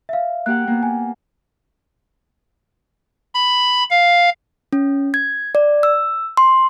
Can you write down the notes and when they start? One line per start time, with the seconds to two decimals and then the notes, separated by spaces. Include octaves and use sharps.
0.09 E5 F5
0.46 A#3 G4 F#5 F#6
0.67 A#3 B3
0.83 G#5
3.35 B5
3.91 F5
4.73 C#4
5.14 G#6
5.55 D5
5.83 E6
6.37 C6